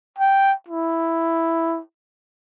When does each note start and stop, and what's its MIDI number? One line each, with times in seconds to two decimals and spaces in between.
0.18 0.53 79
0.69 1.80 64